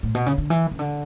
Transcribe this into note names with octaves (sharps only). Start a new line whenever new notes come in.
A2
B2
C#3
D3
E3
C#3
D3